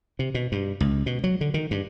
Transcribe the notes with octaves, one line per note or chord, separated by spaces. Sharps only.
C3
B2
G2
C#2
B2
F#3
D3
D#3
G2